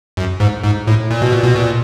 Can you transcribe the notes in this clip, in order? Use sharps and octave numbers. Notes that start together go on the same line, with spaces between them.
F#2
G#2
G#2
A2
A#2
B2
A#2
B2
A#2